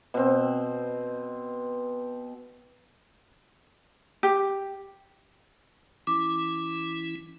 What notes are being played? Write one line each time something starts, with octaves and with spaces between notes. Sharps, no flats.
B2 C4
G4
E3 C#4 E4 D6